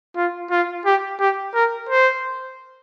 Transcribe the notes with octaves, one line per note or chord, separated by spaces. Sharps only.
F4
F4
G4
G4
A#4
C5